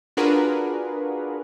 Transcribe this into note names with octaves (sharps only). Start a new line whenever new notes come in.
D4 F4 F#4 G#4 A#4 B4